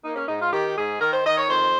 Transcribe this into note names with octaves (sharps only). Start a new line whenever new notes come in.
A#3 D#4
C#4
G#2 D#4
F4
D#3 G4
G#2 G#4
D#3 A#4
C5
D#3 D#5
C#5
F2 C5